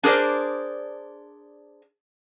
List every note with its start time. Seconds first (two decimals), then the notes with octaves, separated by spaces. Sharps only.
0.03 D4 G#4 A#4 C5 D5